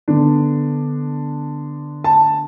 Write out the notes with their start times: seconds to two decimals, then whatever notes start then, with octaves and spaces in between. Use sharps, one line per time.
0.08 D3 B3 D4
2.04 A5